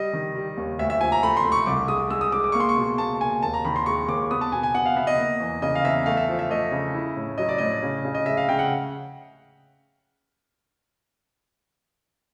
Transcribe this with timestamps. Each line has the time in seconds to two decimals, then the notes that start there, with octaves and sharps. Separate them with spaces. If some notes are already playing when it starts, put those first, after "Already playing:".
Already playing: G3 D#5
0.13 D#3
0.35 G3
0.57 D#2
0.79 D2 E5
0.90 E5
1.00 F3 G#5
1.12 A#5
1.22 A3 B5
1.37 C6
1.44 A3
1.52 C#6
1.66 C2 D6
1.88 G#3 D#6
2.10 G#3 E6
2.21 D#6
2.32 G#3 D6
2.44 D6
2.52 A#3 C#6
2.60 C6
2.69 C#6
2.76 B2
2.98 A#3 A5
3.21 A#3 G#5
3.43 D#2 A5
3.54 A#5
3.65 D#3 B5
3.76 C6
3.86 G#3 C#6
4.08 D#2 D6
4.31 B3 D#6
4.41 A5
4.52 B2 G#5
4.63 G#5
4.74 B3 F#5
4.86 F5
4.96 B3 E5
5.07 D#5
5.18 A#3
5.40 E2
5.62 C#3 D#5
5.75 F5
5.85 E2 E5
6.06 A3 F5
6.17 E5
6.29 F3
6.39 E5
6.50 A3 D#5
6.72 C#3
6.94 E4
7.16 A2
7.38 F#3 D#5
7.49 D5
7.58 A2 D#5
7.83 C#3
8.05 C#3
8.15 D#5
8.26 G#3 E5
8.37 F5
8.49 C#3 G5
8.59 F#5